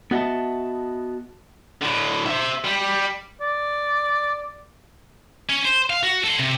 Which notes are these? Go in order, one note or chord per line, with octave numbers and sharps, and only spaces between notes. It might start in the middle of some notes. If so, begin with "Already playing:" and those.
B3 F#4 D#5 E5 A5
A2 D3
C5 E5
G3
D5
C#4
C5
F5
F#4
A4 C6
C3